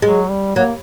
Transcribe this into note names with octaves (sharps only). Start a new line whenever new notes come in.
F#3 G#3
G3
F#3 A#3